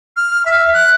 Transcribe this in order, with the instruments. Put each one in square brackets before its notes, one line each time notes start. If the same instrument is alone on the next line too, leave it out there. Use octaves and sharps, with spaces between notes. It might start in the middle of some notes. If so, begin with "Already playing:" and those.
[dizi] F6
E5
F#6